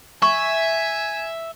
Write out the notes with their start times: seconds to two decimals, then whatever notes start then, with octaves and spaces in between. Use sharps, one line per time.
0.22 E5 G#5 C#6